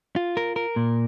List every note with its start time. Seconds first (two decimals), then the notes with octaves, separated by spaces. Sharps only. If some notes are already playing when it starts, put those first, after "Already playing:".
0.16 F4
0.37 A#4
0.56 A#4
0.76 A#2